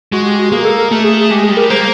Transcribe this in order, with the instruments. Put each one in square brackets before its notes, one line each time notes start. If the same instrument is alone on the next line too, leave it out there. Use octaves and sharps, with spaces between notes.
[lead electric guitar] G#3 [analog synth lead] F#4
[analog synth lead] G4
F#4
[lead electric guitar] A#3 [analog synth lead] G#4
[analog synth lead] A4
A#4
[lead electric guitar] A3
[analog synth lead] G#4
G#4
[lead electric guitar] G#3 [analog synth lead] G4
[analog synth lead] G#4
[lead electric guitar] G3
[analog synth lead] A#4
[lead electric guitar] A#3 [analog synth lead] C5